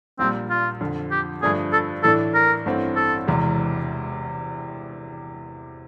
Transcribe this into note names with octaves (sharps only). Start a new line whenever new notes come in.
A#1 A#2 G3 C4
F4
F2 D3 F3
G4
G2 D3 F3 A3 D4 G#4
A4
A2 E3 A3 D4 A4
A#4
A1 G2 E3 A3 C4
A4
E1 E2 C3 E3 G#3